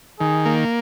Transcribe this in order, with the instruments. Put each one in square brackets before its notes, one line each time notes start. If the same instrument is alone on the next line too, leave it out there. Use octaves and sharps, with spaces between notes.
[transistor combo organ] D#3 [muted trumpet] G#4
[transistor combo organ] A#3